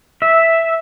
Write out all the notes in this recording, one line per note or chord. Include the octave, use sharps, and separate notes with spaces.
E5